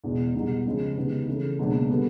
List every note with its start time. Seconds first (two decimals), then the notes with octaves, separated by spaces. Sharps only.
0.04 E2 B2 G#3
0.35 C2 B2 G#3
0.65 C#2 C#3 F3 G#3
0.97 C#2 C3 D#3 G#3 B3
1.28 C#3 E3 A3
1.59 C#2 B2 F#3 A#3 D4
1.90 D3 G3 B3